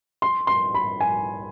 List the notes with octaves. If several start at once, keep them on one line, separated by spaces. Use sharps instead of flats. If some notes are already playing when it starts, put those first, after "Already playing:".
C6
C6
B5
G#5